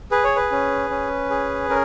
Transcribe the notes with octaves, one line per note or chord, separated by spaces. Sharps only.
G#4 B4
C#5
B4
C#4
C#4
G#4
C#4 A#4